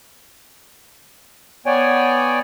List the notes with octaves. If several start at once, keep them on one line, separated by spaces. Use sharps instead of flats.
B3 C#5 D5 G5 G#5